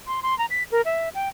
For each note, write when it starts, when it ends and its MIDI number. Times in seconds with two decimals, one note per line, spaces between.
0.07 0.20 84
0.23 0.37 84
0.38 0.46 82
0.50 0.63 95
0.71 0.81 70
0.85 1.09 76
1.15 1.29 79